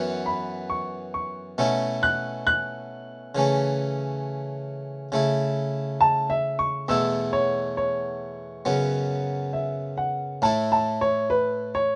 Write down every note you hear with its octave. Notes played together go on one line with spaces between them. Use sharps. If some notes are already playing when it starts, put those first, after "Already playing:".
Already playing: F#2 E3 B3 F#4
B5
C#6
C#6
B2 A3 C#4 E4
F#6
F#6
C#3 E3 A3 C#4
C#3 A3 E4
A5
E5
C#6
E2 B2 A3 E4 E6
C#5
C#5
F#2 C#3 F#3 B3
E5
F#5
A2 A3 E4 A5
A5
C#5
B4
C#5